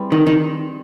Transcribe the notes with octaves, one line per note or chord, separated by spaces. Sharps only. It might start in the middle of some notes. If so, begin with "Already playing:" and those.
Already playing: G3 C4 E4 G#4 B4
D#3
D#3